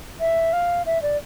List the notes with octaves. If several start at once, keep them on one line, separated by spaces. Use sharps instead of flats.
E5
F5
E5
D5